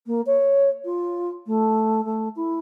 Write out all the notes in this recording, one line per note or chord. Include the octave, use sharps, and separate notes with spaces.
A#3
C#5
F4
A3
A3
E4